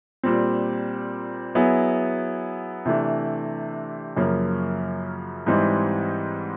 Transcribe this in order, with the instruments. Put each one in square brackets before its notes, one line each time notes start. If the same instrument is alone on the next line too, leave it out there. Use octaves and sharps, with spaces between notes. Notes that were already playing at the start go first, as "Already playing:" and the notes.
[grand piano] A#2 G3 C4
F#3 B3 E4 G#4
C3 E3 A3 D4
F#2 C#3 F3 A#3
G#2 E3 G3 C4 D#4